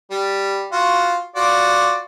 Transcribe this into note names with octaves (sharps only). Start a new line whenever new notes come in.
G3
F4 F#4
F4 F#4 D5